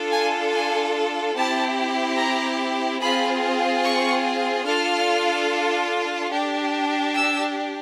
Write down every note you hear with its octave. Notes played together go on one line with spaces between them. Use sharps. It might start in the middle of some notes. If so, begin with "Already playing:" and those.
Already playing: D4 F4 A4
G#5
G#5
C4 E4 G4 A5
A#5
C4 F4 G#4 B5
C#6
D4 F4 A4 F6
D4 G4
E6